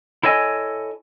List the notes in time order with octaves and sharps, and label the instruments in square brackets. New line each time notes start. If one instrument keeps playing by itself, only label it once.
[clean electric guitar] E4 A4 C#5 D#5 G#5